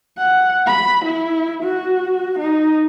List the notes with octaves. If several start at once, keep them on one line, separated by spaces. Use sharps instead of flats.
F#5
B5
E4
F#4
D#4